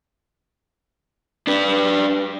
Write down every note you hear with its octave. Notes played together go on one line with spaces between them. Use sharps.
D4 B4